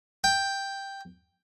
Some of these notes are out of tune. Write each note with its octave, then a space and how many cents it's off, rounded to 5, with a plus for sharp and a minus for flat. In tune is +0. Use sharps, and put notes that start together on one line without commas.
G5 +5